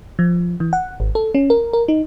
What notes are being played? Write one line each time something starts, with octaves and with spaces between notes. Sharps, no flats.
F3
E3
F#5
G#1
A4
C#4
A#4
A#4
D#4